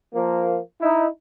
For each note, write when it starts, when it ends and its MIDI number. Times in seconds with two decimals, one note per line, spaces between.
0.14 0.58 53
0.14 0.58 58
0.81 1.05 63
0.81 1.05 64